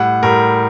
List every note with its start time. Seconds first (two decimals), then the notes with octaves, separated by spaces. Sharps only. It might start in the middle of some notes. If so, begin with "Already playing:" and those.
Already playing: A2 G3 F#5
0.23 A2 G3 A#4